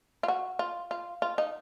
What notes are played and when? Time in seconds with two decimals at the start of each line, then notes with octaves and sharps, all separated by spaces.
0.23 F4
0.28 F#4
0.59 F4
0.91 F4
1.22 F4
1.38 D#4